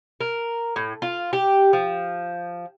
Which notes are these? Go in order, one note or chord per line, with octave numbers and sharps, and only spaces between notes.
A#4
A2
F4
G4
F3